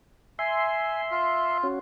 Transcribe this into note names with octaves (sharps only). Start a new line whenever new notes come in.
E5 G#5 C6
F4
C#4 F#4